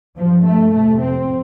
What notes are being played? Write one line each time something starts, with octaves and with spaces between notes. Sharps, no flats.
G2 F3
A3
F2 C3 A3
C4